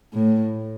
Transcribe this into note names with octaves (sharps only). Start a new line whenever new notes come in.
A2